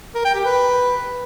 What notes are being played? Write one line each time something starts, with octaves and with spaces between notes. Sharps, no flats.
A#4
G5
G4
B4